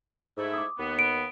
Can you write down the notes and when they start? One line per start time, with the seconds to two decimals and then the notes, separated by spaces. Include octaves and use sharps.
0.38 G#2 A3 E4
0.54 D6 D#6
0.79 D#2 B3
0.99 D7